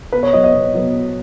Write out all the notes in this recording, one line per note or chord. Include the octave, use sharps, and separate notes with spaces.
B2 B4
C#5
F#3 B3 D#5
D#5
B2
F#3 B3
B2